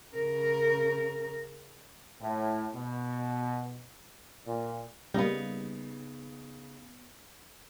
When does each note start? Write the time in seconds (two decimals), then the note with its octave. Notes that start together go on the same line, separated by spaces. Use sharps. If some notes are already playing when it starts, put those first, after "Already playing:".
0.14 C#3 A#4
2.21 A2
2.75 B2
4.46 A#2
5.14 C#3 G3 A#3 B3 D#4